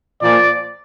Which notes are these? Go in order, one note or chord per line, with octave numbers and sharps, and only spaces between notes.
A#2 F3 D5